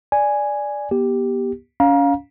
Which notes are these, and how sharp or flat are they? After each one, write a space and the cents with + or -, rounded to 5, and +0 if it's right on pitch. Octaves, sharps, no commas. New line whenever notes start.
D5 +0 G#5 +0
B3 -35 G4 +0
C#4 +30 F5 +15 A#5 +30